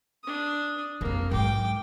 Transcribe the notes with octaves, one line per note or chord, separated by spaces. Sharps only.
D4 D#6
F1 F2 A#3
G#2 F#3 G5 D6